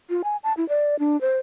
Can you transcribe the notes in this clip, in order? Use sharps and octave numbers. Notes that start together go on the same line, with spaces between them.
F4
G#5
A5
E4
D5
D4
C5